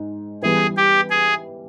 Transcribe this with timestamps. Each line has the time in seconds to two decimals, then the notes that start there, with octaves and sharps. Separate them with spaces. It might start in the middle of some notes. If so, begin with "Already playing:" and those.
Already playing: G#2
0.42 E3 G3 B3 G#4
0.77 G4
1.10 G#4